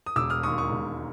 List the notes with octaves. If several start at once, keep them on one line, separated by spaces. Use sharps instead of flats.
D#6
E1 D6 E6
D#6 F6
D#2 D#3 G#3 C#6 D#6
C#6 D#6
E1